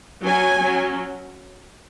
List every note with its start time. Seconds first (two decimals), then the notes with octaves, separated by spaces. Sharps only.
0.25 F#3 C#4 G#5
0.62 F#3 C#4